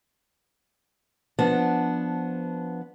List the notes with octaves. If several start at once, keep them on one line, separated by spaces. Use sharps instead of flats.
F3 B3 D4 F#5